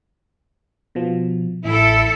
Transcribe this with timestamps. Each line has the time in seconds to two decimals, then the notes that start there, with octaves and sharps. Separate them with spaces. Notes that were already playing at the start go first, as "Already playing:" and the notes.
0.95 B2 F3
1.65 A1 E4 A4